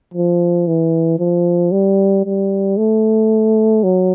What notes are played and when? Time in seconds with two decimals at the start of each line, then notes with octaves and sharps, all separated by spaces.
0.14 F3
0.67 E3
1.19 F3
1.71 G3
2.25 G3
2.77 A3
3.83 F#3